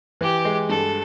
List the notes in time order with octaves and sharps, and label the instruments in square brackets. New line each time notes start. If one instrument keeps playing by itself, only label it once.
[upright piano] E3 [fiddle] G4
[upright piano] G#3
[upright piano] G2 [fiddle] A4